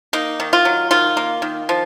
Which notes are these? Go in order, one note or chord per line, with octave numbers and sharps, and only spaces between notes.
A#3 D#4
D#3
F4
F#3
D#3 F4
A#3
D#3
F3